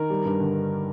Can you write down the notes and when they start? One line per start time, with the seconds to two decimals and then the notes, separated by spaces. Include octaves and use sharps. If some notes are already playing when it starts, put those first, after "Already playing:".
Already playing: D#3 A#4
0.10 G3
0.25 G2
0.40 D3